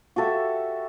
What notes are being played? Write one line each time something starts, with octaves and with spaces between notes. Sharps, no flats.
F#4 G4 A4 E5